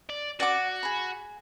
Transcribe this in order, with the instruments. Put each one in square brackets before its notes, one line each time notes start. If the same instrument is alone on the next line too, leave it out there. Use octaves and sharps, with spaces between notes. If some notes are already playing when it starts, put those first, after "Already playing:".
[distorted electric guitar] D5
[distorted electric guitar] F#4 [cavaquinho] D5 F#5 D6
[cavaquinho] G#4 B5